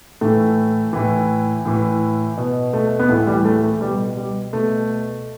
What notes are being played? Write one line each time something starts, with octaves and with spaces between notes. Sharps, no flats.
A2 E3 A3
A2 E3
A2 E3
B2
A3
B3
A2 E3 A3
G3
A3
A3
B2 G3
G3
B2 A3